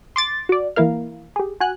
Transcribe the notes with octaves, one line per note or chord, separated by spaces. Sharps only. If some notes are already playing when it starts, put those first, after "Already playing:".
C6 D6 A6
F#4 D5
E3 A#3 E4 A#4 F5
G4 G#4
F#4 G#5 F#6